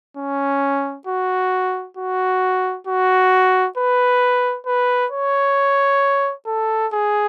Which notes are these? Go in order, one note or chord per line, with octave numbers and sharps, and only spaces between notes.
C#4
F#4
F#4
F#4
B4
B4
C#5
A4
G#4